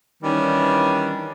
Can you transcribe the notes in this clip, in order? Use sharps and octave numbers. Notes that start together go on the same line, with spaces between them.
D#3 E3 G3 C#4 D4